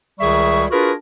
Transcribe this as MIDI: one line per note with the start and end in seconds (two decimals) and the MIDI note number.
0.19 0.65 37
0.19 0.65 51
0.19 0.65 55
0.19 0.65 68
0.19 0.65 76
0.19 0.65 85
0.71 0.92 62
0.71 0.92 65
0.71 0.92 66
0.71 0.92 68
0.71 0.92 70
0.71 0.92 71